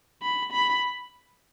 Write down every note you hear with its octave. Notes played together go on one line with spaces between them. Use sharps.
B5
B5